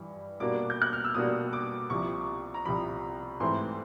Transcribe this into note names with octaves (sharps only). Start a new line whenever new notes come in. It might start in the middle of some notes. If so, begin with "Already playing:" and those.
Already playing: G2 E3 G3
B2 G3 A#3 D4 F#4 D6
G6
F#6
F6
E6
B2 G3 A#3 D4 F#4 D#6
D6
C2 C3 F3 C#6
A#5
C2 C3 F3 B5
G#2 E3 A3 C4 E4 C6